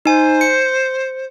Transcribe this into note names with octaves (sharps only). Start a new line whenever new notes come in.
D#4 C5 G#5
C#7